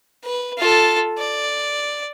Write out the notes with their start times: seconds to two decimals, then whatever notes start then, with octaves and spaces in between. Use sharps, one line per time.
0.24 B4
0.58 F4 A4
1.18 D5